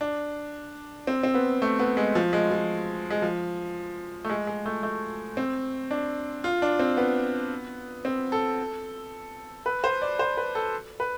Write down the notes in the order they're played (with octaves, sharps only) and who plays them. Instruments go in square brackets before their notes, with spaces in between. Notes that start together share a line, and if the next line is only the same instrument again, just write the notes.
[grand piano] D4
C4
C4
B3
A3
B3
G#3
F3
G#3
F3
G#3
F3
A3
G#3
G#3
A3
A3
C4
D4
F4
D4
C4
B3
C4
A4
B4
C5
D5
C5
B4
A4
B4